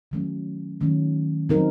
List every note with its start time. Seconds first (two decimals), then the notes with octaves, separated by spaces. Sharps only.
0.11 D#3 F#3 A3 C#4
0.81 D#3 F#3 A3 C#4
1.49 F#3 C4 D#4 A#4